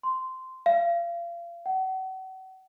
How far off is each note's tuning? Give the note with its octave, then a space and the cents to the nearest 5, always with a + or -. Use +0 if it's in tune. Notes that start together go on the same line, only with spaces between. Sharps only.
C6 -10
F5 -30
F#5 +35